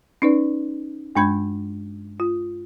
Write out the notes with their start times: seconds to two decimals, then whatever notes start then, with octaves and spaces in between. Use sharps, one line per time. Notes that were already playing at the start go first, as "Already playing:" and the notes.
0.22 C#4 D#4 B4 D5
1.15 G2 G#3 D4 B5 G6 G#6
2.20 F4